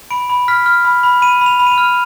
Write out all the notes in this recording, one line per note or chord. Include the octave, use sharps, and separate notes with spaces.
B5 D7
B5
F6 B6
F6
B5
B5
B5 D#7
B5 F7
B5
D#7
F7
F6